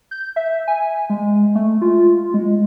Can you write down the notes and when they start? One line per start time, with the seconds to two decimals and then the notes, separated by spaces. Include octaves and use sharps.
0.11 G6
0.36 E5
0.68 G#5
1.10 G#3
1.55 A3
1.82 F4
2.34 G#3